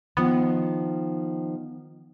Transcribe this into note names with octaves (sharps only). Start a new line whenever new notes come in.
D#3 F3 B3